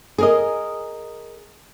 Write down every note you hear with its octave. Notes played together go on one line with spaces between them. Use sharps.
G#4 A#4 D#5